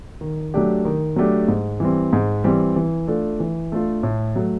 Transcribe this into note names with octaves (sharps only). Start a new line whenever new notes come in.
D#3
F#3 A3 D4 G4
D#3
F#3 A3 D4 G4
G#2
E3 G3 C4
G#2
E3 G3 C4
E3
A3 D4 F4 A4
E3
A3 D4 F4 A4
A2
F#3 A3